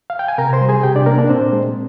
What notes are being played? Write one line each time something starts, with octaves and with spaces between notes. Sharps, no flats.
F5
G5
G#5
C3 A#4 A#5
C5 C6
G3
G#4 G#5
C3 G4 G5
D4 D5
A#3 D4 A#4
D4 D5
A#2 C4 C5
G#3